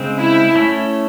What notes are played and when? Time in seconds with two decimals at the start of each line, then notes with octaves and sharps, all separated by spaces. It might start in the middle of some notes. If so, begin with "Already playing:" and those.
Already playing: C#3 G#3 C4
0.18 E4
0.56 A3 C#4 E4